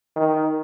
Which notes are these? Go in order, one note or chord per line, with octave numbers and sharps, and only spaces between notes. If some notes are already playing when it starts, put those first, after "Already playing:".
D#3